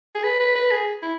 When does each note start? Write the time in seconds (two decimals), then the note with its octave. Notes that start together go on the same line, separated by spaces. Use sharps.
0.15 G#4
0.24 B4
0.40 B4
0.55 B4
0.71 G#4
1.02 E4